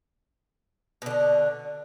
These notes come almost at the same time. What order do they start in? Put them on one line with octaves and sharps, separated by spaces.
B2 D3 D4